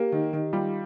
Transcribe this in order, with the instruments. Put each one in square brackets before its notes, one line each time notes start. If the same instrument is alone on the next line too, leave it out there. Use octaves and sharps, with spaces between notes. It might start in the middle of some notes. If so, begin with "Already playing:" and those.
Already playing: [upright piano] A#3 [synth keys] G4
[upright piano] D#3
D#3
[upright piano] G3 [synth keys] F4